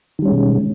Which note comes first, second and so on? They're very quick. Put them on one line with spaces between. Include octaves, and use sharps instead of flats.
D#3 G3 C#4 G#3 B2